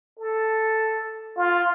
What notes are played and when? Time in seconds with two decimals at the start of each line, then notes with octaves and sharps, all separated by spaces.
0.19 A4
1.37 F4